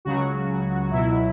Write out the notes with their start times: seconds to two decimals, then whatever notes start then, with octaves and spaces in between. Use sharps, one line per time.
0.05 C#2 C#3 F#3 F#4
0.91 C#2 B2 F#3 E4